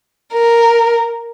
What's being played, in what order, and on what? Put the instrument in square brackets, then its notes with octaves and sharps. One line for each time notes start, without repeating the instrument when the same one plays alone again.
[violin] A#4